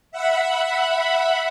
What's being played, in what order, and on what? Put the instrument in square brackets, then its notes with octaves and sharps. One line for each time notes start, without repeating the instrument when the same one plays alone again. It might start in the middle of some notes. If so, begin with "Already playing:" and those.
[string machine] E5 F#5 B5